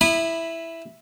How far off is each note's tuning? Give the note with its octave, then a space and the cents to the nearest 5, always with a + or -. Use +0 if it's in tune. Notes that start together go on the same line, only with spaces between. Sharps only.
E4 +0 B5 +0 D#6 -30